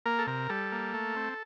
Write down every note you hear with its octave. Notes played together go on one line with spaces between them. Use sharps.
A#3 A#4
A4
C3 A#4
G3 A4
A#3
A3
C4